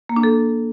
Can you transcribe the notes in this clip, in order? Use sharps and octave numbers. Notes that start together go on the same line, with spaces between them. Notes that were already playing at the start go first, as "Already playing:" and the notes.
A#3
D4
A4